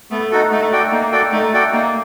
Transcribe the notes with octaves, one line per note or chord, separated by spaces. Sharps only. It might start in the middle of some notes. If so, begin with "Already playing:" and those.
A3 B3
D#4 F#4 A4
A3 D#4
F#4 A4 D5 G5
A#3 D#4
F#4 A4 D5 G5
A3 D#4
F#4 A4 D5 G5
A#3 D#4